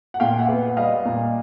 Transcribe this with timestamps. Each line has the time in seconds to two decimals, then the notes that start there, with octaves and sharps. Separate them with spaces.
0.14 F#5
0.20 A#2 F5 G5
0.39 E5 F#5
0.48 B3
0.77 G3 D#5 F5
1.05 A#2